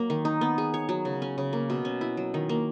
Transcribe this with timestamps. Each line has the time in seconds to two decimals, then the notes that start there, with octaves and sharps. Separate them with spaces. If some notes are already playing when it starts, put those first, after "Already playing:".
Already playing: F#3 A#3
0.10 D#3
0.25 D#4
0.41 B3
0.58 G#4
0.74 C#5
0.89 F#3
1.05 C#3
1.22 C#4
1.38 C#3
1.53 A#3
1.70 B2
1.85 C#4
2.01 E4
2.17 F#3
2.34 D#3
2.49 A#3